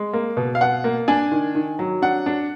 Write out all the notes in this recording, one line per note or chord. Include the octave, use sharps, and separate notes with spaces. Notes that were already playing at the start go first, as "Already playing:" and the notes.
Already playing: G#3
A#3
B2
F5
B2 F#5
A#3
D4 G#5
D#3
D#3
F#3
D4 F#5
D4